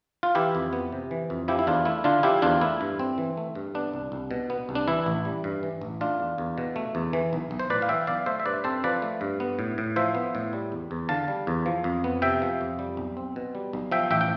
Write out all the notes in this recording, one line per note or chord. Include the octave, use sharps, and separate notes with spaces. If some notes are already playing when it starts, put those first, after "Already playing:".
F4
E3 E4 G4
F2
B3
C3
E3
F2
F3 E4 G4
E4
E2 D4 F4
A3 E4
D3 D4 F4
F3 E4 G4
E2 D4 F4
A3 E4
G2
C4
E3
A3
G2
B3 D4
C2
C2
B2
B3
C2
D4
E3 E4
A1
G3
G2
E3
A1
A3 D4 F4
E2
E2
B2
A3
E2
E3
B1
B1
C5
A2 B4 D5
F5
E3 E5 G5
B1 D5 F5
A3 C5 E5
E5
G2 B4 D5
C4 A4 C5
F3 B4 D5
A3
G2
B3
A2
A2
F3 C5 E5
B3
A2
G3
E2
E2
D3 F5 A5
G3
E2
F3
F2
B3
C3 E5 G5
F3
F2
G3
B1
C4
B2
G3
B1
F3 E5 G5
A1 E5 G5
G5